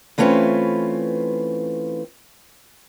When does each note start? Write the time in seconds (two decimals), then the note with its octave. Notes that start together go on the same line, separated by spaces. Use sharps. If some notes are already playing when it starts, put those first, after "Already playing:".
0.18 E3 A3 C4 C#4 F4 B4